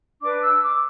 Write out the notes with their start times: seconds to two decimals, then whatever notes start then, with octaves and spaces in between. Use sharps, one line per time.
0.21 D4 B4 D6
0.41 E6
0.61 D6